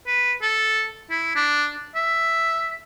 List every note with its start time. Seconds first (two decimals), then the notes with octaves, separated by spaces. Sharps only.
0.07 B4
0.42 A4
1.10 E4
1.36 D4
1.95 E5